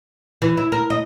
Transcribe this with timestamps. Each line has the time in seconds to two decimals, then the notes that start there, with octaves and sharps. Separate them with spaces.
0.42 E3
0.57 E4
0.72 A#4
0.90 D#5